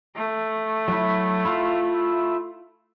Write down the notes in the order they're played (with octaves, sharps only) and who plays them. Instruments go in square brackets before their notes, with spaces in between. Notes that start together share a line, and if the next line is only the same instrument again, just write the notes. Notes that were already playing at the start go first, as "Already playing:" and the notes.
[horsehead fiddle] A3
[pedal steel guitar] F#3 E4
E4 F4 F5